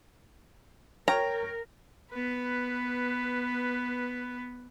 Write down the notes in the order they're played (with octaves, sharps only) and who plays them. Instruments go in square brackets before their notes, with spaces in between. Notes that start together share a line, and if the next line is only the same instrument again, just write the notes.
[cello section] A#4 [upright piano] C#5 G5 F6 [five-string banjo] A#5
[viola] B3 B4